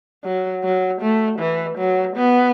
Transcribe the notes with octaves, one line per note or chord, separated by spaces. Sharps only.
F#3
F#3
A3
E3
F#3
B3